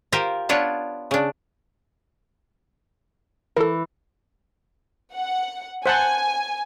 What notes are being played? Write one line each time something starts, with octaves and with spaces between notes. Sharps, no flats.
F4 G4 A#4 C5 F5
B3 D4 F4 C#5
C#3 D4
E3 A4 A#4
F#5
C5 F#5 G#5 A5